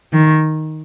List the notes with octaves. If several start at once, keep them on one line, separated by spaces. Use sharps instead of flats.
D#3